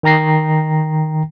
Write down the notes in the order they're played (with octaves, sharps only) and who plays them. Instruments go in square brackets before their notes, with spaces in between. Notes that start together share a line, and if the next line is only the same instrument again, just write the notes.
[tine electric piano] D#3 G5 A#5 A#6 C7